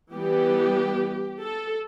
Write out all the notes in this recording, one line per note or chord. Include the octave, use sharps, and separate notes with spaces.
E3 G3 B3 G4
A4